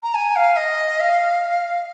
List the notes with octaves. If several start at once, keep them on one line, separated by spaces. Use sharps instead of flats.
A#5
G#5
F5
D#5
F5